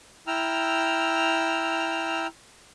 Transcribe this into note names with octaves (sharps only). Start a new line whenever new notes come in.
E4 G5 A#5 E6 F6